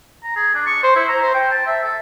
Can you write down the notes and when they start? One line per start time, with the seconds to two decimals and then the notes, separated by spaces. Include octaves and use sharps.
0.24 A#5
0.36 G#4
0.55 D4
0.67 C#6
0.83 C5
0.95 E4
1.08 A#5
1.22 C5
1.34 G5
1.52 A5
1.66 E5
1.84 A4